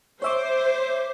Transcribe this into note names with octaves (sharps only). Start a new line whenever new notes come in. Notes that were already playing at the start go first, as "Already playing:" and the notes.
C5 C#5 E5 D6